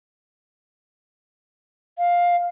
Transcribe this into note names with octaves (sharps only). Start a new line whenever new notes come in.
F5